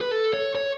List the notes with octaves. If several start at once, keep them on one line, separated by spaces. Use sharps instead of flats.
B4
A4
C#5
C#5